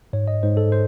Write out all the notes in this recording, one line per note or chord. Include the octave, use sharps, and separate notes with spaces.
G#2 C#5
D#5
G#2 C5
A4
C5